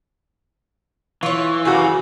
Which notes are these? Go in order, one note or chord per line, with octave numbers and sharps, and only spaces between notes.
E3 F4 C#5 C#6
F#2 C#3 G3 F#4 F5